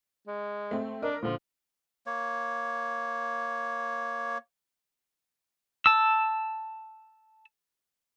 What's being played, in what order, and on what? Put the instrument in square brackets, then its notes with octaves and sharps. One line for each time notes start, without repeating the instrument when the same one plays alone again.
[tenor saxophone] G#3
[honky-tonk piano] A3 C4
[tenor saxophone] D4 [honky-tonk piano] A#4 D#5
[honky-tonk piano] A#2 D3 [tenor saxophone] F3
[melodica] A#3 C#5
[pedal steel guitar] A5 E6